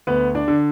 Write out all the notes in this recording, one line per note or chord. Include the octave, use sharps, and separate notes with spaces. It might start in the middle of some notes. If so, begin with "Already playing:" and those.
D2 B3 B4
D4 D5
D3